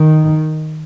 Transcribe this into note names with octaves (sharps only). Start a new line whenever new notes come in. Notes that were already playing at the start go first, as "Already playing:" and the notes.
Already playing: D#3